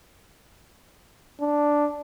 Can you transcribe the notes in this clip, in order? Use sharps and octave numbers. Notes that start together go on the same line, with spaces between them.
D4